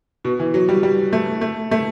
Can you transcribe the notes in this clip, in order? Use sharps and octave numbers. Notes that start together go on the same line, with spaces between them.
B2
E3
F#3
G3
G3
A3
A3
A3